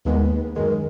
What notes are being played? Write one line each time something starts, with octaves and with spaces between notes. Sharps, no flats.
D#2 D#3 G#3 B3 B4
F#2 D#3 G#3 A#4